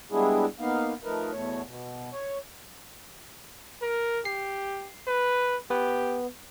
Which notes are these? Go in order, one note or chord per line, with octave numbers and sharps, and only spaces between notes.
G3 G#3 B3 D4 E4 G#4
A#3 B3 D#4 F5
F3 A3 D#4 A#4 B4
E2 B2 A3 C#5
B2
C#5
A#4
G4 C7
B4
B3 G4 B4